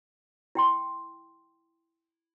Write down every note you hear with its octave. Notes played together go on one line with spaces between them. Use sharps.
E4 G5 C6